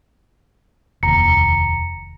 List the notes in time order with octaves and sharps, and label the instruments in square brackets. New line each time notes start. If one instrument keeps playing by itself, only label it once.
[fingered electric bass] F1 D#2 [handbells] A#5 C#7